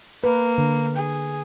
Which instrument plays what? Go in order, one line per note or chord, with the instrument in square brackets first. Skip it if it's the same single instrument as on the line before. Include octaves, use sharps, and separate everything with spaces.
[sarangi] A#3 [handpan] B4
[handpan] D3
[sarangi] G#4